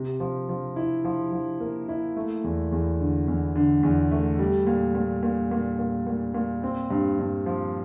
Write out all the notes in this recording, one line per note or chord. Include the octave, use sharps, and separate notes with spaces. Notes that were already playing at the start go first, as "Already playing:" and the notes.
Already playing: C3
F3
F3
E4
F3
F3
A#3
E4
A3
E2
E2
D3
E2
D3
E2
A3
G3
A#2
A#2
A#2
A#2
A#2
A#2
A#2
C4
G2
G2
F3